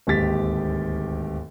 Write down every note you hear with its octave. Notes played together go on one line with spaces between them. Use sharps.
D1 D#2 G#2 G4 A6 B6